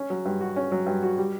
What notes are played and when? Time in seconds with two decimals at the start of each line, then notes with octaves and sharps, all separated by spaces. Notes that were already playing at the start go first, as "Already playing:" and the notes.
Already playing: C#4
0.10 F#3
0.25 G2
0.41 F#4
0.56 C#4
0.72 F#3
0.86 G2
1.03 F#4
1.18 G3